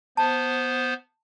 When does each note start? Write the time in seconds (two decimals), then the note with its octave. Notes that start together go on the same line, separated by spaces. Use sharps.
0.17 B3 C5 A5